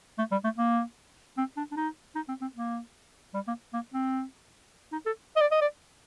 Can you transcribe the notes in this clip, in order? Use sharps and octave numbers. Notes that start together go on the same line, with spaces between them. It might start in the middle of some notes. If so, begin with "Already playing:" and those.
A3
G3
A3
A#3
C4
D4
D4
D#4
D#4
C4
C4
A#3
G3
A#3
A#3
C4
D#4
A4
D#5
D5
D#5
D5